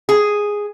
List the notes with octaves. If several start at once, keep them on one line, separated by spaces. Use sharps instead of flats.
G#4